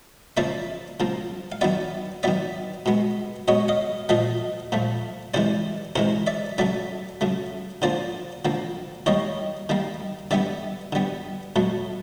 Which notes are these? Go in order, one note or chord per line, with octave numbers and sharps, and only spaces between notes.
C#3 F3 A#3 D5 E5
C#3 F3 A#3
F5
D#3 F#3 B3 D5 E5
D#3 F#3 B3 D5 E5
B2 G#3 B3
B2 G#3 B3 C#5 D#5
D#5 F5
A#2 F3 A3 D#5 F5
A#2 F3 A3
C3 E3 G#3 C5 D5
C3 E3 G#3 A#4 C5
D5 E5
C#3 F#3 A3 D5 E5
C#3 F#3 A3
D3 F3 A#3 C5 D5
D3 F3 A#3
D#3 G3 A#3 C#5 D#5
D#3 G3 A#3
D3 G3 B3 D5 E5
D3 G3 B3
B2 F#3 A3